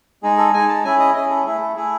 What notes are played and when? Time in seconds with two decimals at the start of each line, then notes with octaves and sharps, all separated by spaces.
0.23 G#3 D#4 G#4
0.38 A4
0.53 G#3 D#4 G#4 G#5
0.69 A5
0.84 C#4 E4 G#4 G#5
1.00 D#5
1.15 C#4 E4 G#4 D#5
1.30 A4
1.46 A3 E4 G#4
1.61 A4
1.76 A3 E4 G#4